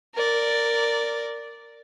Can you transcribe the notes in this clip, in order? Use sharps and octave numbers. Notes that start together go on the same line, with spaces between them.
A#4 D5